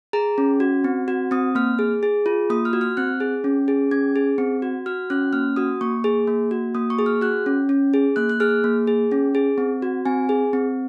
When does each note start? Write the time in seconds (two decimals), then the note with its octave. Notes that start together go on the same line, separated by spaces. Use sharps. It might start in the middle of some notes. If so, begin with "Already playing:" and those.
0.13 G#4 A#5
0.38 C#4
0.60 F#4
0.84 C4
1.08 F#4
1.31 C4 D#6
1.55 A#3 F6
1.79 G#4
2.03 G#4
2.26 F4
2.50 A#3 D#6
2.65 F6
2.73 F#4
2.81 F6
2.97 C4 F#6
3.20 G#4
3.44 C#4
3.68 G#4
3.91 C#4 G#6
4.16 G#4
4.38 C4
4.62 F#4
4.86 F#4 F6
5.10 C#4 F#6
5.33 A#3 F6
5.56 F#4 D#6
5.81 A#3 C#6
6.04 G#4
6.27 A#3
6.51 F#4
6.75 A#3 D#6
6.90 C#6
6.99 G#4
7.06 F6
7.21 F#4 F#6
7.46 C#4
7.69 C#4
7.94 G#4
8.16 A#3 F#6
8.30 F#6
8.40 G#4 F6
8.64 A#3
8.87 G#4
9.12 C#4
9.35 G#4
9.58 C4
9.82 F#4
10.05 C4 G#5
10.29 G#4
10.53 C4